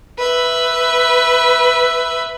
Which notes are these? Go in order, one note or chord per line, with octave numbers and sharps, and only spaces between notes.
B4 E5